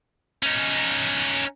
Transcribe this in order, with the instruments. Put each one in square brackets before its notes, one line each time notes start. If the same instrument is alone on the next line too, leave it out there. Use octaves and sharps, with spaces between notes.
[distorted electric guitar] C#4 D#4